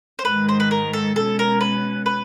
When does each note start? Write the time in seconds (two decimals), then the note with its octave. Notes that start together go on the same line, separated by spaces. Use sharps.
0.19 C5
0.25 G#2 D#3 G#3 B4
0.49 C5
0.60 B4
0.71 A#4
0.93 A4
1.16 B2 G#3 C#4 A4
1.39 A#4
1.61 B4
2.06 B4